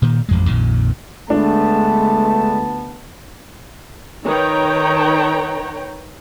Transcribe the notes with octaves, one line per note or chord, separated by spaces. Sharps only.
A#2 D#3
A1 F2 G#3
A#1 F2 A#2 D#3
D2 G#3 A3 B3 D4 A5
D#3 B4 C#5 G5 A#5